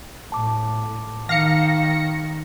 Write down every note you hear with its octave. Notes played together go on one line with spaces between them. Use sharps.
A2 A5 D6
D#3 F5 A#6 C#7